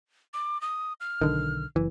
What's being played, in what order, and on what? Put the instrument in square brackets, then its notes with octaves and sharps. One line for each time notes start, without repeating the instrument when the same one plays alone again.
[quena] D6
D#6
F6
[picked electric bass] B1 D3 D#3
F#1 E3